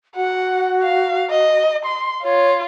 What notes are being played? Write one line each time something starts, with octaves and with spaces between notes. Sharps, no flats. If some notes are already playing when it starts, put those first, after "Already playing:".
F#4 F#5
F5
D#5
C6
F4 C#5